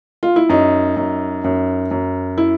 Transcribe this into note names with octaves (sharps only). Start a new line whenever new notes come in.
F4
E4
F#2 D#4
F#2
F#2
F#2
E4